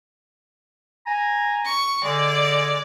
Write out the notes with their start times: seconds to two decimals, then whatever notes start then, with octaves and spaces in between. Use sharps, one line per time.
1.07 G#5 A#5
1.65 C#6
2.04 D3 G#3 D5